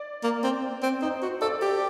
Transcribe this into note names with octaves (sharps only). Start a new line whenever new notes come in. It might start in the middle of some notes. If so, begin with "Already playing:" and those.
Already playing: D5
A#3
C4
C4
D#4 C5
F#4
A4 D5
G4